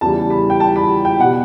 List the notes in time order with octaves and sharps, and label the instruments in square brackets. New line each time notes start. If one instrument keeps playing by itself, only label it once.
[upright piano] E2 C#3 E3 G3 A5
B5
G5
A5
B5
G5
B2 G3 F#5